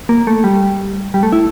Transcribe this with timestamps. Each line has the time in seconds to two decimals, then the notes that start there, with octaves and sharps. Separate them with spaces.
0.09 A#3
0.27 A3
0.44 G3
1.14 G3
1.23 A3
1.32 E4